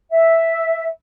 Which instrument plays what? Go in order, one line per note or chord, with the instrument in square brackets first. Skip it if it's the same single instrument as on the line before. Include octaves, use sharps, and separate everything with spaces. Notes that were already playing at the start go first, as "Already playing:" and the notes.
[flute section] E5